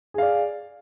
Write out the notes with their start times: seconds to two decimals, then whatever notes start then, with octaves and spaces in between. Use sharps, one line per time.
0.14 G#4
0.18 F5
0.22 D5